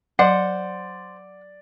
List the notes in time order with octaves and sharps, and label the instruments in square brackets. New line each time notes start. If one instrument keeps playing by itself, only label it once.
[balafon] F#3 [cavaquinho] C5 [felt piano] D5 [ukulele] F#5